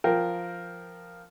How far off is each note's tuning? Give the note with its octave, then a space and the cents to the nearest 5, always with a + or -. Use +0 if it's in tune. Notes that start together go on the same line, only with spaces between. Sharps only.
F3 +0 A#4 +0 G5 +0